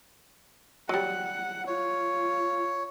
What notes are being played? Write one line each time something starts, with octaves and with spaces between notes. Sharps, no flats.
F#3 G3 F#5
F4 C#5